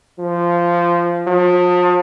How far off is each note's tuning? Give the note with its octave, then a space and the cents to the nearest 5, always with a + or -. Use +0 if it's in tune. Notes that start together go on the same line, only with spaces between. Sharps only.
F3 -15
F3 +35